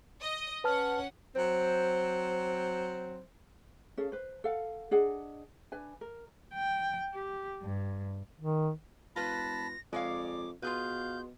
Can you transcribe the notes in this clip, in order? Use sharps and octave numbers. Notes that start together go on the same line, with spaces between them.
D#5
C#4 B4 F#5 A5 F6
F#3 C4 C5
C#4 G#4 A4 F5
B4 C5
A4 F5 F#5
D4 G#4 D#5 F#5
D4 B4 G#5
A#4
G5
G4
G2
D#3
F1 F4 B4 A5 B5 A#6
F2 G#3 C#5 D5 F5 D6
B2 F4 G#4 B4 F5 G6